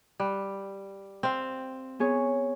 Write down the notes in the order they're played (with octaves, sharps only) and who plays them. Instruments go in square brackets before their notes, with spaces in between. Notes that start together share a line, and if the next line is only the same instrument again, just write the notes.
[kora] G3 [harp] F#6
[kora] C4 F5
[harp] B3 G#4 C#5